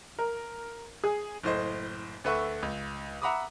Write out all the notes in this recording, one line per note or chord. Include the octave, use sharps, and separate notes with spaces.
A#4
G#4
F#1 A2 C5 D#5
D2 A3 B4 E5 F#5 C#6
C#2
E5 F#5 A#5 B5 D6 D#6